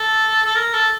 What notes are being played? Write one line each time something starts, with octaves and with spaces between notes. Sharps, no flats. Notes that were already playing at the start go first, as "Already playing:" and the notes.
Already playing: A4
A4
A#4
A4